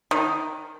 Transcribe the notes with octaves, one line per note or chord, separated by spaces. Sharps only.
D#3